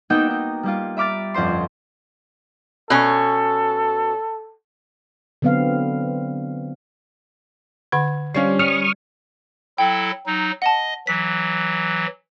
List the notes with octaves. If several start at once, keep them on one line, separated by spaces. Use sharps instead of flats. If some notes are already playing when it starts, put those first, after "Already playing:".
A#3 B3 D#4 F#4 G5 E6
D#4
G3 A#3 F4
E5 B5 D6 F6 A6
G1 F2 C#4 C5 C6
B2 C#4 A4
D3 F#3 B3 C4 F5
D3 F#5 B5 G#6
G3 C#4 D4 F4 C#5 C7
G3 C#6 D#6 F6
F#3 E4 A4 G5
F#3 D#4
D#5 F#5 A5
E3 F#3 B6